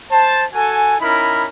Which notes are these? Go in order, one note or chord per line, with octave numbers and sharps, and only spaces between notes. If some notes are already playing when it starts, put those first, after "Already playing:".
C5 A5
F#4 A4 G#5
C#4 D#4 E4 A#4 B5